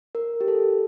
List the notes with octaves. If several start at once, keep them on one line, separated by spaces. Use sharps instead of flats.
A#4
G4
A4